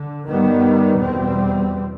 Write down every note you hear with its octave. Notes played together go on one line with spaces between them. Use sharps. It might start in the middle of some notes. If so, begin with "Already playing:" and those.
Already playing: D3
G2 D#3 G3 B3
E2 B2 G3 C4